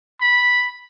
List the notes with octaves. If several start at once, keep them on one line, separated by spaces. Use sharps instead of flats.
B5